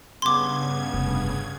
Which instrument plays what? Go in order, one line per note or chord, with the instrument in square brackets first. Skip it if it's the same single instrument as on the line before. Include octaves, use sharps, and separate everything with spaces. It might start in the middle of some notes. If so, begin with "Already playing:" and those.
[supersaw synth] G2 C#3 G#6 [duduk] B3 [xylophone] C6 D6
[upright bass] F1